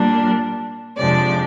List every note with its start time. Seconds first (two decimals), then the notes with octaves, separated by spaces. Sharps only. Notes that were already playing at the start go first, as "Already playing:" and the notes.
Already playing: A#2 G3 A#3 D4
0.98 F2 C3 F3 G#3 D4 D5